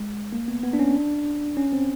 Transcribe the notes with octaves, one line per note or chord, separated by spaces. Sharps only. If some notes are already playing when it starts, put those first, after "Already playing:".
Already playing: G#3
A#3
B3
B3
D4
C#4
D4
C#4
C4